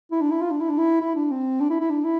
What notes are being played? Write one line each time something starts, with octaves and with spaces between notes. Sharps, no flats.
E4
D4
E4
F4
D4
E4
D4
E4
E4
D4
C4
D4
E4
E4
D4
E4